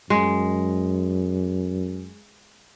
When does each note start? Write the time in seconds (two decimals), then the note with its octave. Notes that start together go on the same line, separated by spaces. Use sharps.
0.10 F#2 G#3